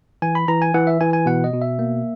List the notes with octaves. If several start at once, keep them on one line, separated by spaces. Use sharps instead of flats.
E3 G#5
B5
E3 A#5
G#5
E3 F#5
E5
E3 G#5
G#5
B2 F#5
D#5
B2
E5
A#3